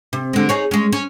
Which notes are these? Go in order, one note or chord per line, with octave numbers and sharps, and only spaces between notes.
C3
D3 G#3
D#4 G#4 C#5
G#3 C#4
C#4